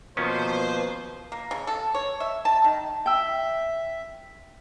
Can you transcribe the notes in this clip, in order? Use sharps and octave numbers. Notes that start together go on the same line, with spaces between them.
B2 D#3 F3 A#3 B3 C#4 B4 C5
A#3
C#3
A4
C#5
E5
A5
D#3
E5 G5 E6